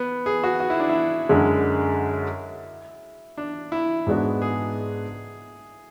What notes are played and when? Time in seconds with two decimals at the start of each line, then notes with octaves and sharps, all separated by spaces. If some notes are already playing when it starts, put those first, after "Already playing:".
Already playing: B3
0.26 G#4
0.44 F#4
0.60 F#4
0.70 E4
0.80 D4
0.89 E4
1.29 F#2 D3 G#3
3.37 D4
3.72 E4
4.07 G#2 G#3 B3 D4 F#4
4.42 G#4